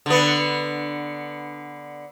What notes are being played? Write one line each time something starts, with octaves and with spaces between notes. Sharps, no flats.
D3 B3